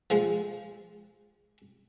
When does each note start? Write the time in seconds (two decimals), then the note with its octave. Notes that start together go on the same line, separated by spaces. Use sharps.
0.10 F3 G#3